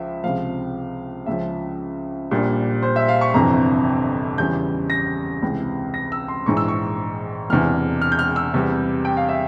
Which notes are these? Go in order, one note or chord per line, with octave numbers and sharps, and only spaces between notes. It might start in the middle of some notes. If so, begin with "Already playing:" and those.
Already playing: C#2 F3 E5
C#2 C3 F3 F5
C#2 C#3 F3 E5
A#1 A#2 G3
C5
E5
F5
C#6
G1 F2 C3 E3 A#5
E2 C#3 E3 G3 G6
A#6
C#2 C3 E3
A#6
E6
C6
A#1 G#2 E3 C#6
E6
C#6
E1 E2 C3 E3 F6
F6
G6
F6
E6
E2 C3 G3
G5
F5
E5